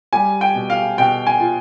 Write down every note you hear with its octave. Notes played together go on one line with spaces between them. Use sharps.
G3 G#5
G5
B2
F5
B2 G5
G#5
F4